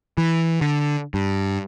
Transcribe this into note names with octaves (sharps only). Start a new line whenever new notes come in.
E3
D3
G2